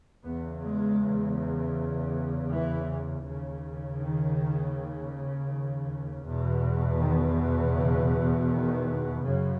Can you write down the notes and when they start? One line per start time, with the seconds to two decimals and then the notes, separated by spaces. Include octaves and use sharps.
0.23 E2 C#3 B3
0.61 G#3
2.49 E3
3.24 D#2 C#3
3.99 D#3
6.24 E2 B2
7.00 D#3
7.75 C#3
8.50 D#3
9.24 F#2 C#3